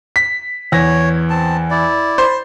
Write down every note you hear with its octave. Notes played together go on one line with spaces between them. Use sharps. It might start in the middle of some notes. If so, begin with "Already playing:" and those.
B6
E2 C#5 A#6
C4 A5
E4 D5
C5 B5 C6